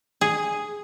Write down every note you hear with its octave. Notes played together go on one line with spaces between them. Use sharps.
G#4